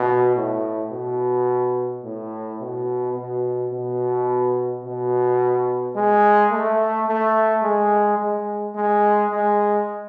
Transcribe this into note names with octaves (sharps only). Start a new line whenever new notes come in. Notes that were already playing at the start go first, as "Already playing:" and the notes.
Already playing: B2
A2
B2
A2
B2
B2
B2
B2
G#3
A3
A3
G#3
G#3
G#3
G#3